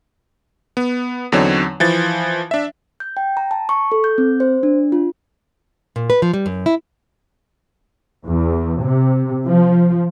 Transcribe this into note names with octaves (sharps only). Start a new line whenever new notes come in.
B3
E2 D3 F#3 C4 D#4 C#5
E3 F3 A6
D4 E5
G6
G5
A#5
A5
C#6
A4
G6
C4
C5
D4
F4
A#2
B4
F3
G3
F#2
E4
E2
C3
F3